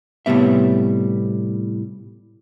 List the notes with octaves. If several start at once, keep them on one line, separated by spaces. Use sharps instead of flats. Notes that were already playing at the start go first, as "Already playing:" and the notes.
A2 C3 G3 B3 E5